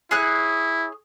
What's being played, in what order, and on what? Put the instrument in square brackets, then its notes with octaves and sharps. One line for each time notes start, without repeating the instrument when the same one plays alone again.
[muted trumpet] E4 [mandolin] G#4 C#5 F#6